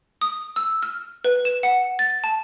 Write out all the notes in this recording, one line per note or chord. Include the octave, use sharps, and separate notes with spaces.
D#6
E6
F6
B4
E7
F#5
A6
A5